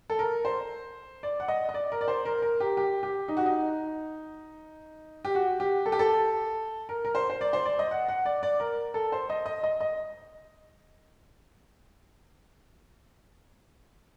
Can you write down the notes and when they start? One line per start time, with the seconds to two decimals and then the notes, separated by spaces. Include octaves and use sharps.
0.10 A4
0.19 A#4
0.45 C5
1.23 D5
1.40 F#5
1.48 D#5
1.69 D#5
1.74 D5
1.92 A#4
2.01 D5
2.08 C5
2.25 A#4
2.42 A#4
2.60 G4
2.77 G4
3.03 G4
3.28 D#4
3.37 F#4
3.46 D#4
5.25 G4
5.35 F#4
5.60 G4
5.86 A4
5.92 G4
5.99 A4
6.89 A#4
7.05 A#4
7.15 C5
7.30 C5
7.41 D5
7.53 C5
7.65 D5
7.79 D#5
7.91 F#5
8.09 F#5
8.25 D5
8.43 D5
8.60 A#4
8.94 A4
9.12 C5
9.30 D#5
9.46 D#5
9.64 D#5
9.81 D#5